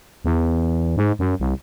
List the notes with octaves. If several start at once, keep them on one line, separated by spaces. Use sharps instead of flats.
E2
G#2
F#2
C2